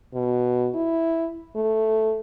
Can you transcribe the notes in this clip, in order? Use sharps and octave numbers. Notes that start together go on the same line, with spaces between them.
B2
E4
A3